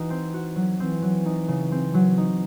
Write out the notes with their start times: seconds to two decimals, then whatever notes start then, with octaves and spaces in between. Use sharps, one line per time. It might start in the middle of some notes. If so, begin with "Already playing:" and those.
Already playing: E3 D#4 F#4
0.10 C4
0.34 F#4
0.56 F#3
0.79 E3 C4
1.02 F#3
1.26 D#4
1.48 C#3
1.72 C4
1.94 F#3
2.18 D#4